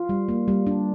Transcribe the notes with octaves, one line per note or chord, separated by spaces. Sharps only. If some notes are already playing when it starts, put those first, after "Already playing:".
Already playing: F4
G3
A#3
G3
D4